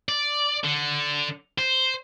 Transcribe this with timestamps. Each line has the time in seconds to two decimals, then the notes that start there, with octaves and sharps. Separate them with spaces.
0.09 D5
0.64 D3
1.58 C5